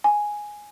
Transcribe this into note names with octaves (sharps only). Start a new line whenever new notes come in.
G#5